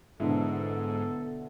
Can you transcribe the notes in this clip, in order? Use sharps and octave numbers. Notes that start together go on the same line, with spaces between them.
G#2 B2 D3 E4 A4